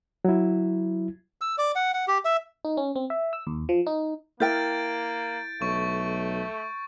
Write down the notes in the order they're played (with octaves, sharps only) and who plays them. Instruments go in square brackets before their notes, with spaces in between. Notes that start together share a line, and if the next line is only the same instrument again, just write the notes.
[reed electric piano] F#3 E4
[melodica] E6
D5
F#5
F#5
G4
E5
[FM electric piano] D#4
C#4
C4
E5
E6
D#2
F3
D#4
[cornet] A#3 [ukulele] E4 A#4 G5 [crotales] G6 A6 D7
[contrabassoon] B1 [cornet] A3 [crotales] C#6